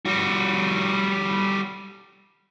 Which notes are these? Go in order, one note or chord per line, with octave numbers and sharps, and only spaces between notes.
G3 F#4